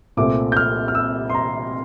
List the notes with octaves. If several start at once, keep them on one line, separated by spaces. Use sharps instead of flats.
C2 A#2 A3 C4 D6
G6
F6
F6
E6
C6
A#5